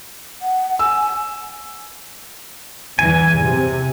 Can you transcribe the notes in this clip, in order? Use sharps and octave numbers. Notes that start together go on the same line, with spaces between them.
F#5
G#5 E6
E2 E3 G#5
C3